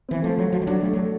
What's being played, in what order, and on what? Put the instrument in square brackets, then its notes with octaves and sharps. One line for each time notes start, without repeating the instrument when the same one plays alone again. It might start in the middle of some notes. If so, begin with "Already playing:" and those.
[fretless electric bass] E3 [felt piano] C4
[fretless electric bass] F3 [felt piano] A3
[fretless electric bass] F#3 [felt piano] A4
[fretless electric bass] F3 [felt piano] F#4
[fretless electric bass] G3
[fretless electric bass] F#3 [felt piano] D4
[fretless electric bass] G3 [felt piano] A3
[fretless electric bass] F#3 [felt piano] A4